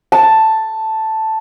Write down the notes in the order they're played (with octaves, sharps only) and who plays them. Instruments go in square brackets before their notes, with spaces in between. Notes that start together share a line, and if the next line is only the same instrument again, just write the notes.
[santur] A5